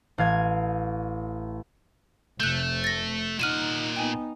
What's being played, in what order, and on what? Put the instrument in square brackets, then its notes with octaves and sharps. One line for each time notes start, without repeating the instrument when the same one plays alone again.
[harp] A1 F5 G#6
[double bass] F1 C3 [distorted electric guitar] A3 [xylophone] F#6 G6
[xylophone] A6 A#6
[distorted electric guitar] A#2 F#5 [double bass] D#4 [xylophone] F6 D#7 E7
[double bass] B3 D#4 [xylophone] G5 G#5